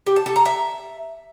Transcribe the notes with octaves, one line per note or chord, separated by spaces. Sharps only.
G4
A5
A4
A#5
E5